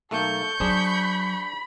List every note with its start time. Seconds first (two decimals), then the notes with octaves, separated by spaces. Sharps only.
0.11 B1 A3 A#3 A4 C#6 G6
0.60 F#3 D4 G#4 C5 B5